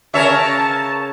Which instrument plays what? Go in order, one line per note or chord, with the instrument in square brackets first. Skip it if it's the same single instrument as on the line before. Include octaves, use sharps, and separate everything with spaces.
[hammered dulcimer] C#3 C#4 [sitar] A#4 C#5 E5 [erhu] A5